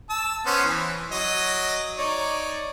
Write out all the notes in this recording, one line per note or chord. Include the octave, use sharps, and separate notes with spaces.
A5 E6
B3 C#4 C5
E3
F#3 D#5
D#4 C#5 D5